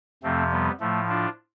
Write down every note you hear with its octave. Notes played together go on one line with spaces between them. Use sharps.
F2 C3 F3 A3 C4
G3 B3
A2 F3 A3
D4 F4